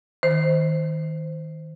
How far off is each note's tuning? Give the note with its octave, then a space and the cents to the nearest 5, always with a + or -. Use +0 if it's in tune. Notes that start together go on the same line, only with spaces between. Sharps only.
D#3 +25 C5 -5